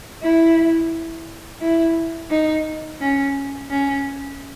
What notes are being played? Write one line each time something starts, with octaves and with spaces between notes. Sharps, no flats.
E4
E4
D#4
C#4
C#4